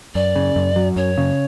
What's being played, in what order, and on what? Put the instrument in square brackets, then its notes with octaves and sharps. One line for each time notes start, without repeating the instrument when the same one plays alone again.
[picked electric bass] F#2 [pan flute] D5
[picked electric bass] C#3
F#2
F#3
[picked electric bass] F#2 [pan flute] C#5
[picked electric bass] C#3